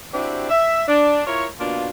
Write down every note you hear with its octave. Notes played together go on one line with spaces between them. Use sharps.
C4 D4 E4 F#4 G4
E5
D4
E4 F4 A#4 C#5
B2 A#3 D4 F4